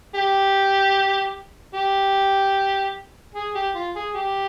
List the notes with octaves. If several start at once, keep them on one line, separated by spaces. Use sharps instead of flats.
G4
G4
G#4
G4
F4
G#4
G4